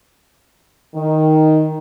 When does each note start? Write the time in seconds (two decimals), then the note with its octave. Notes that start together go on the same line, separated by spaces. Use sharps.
0.96 D#3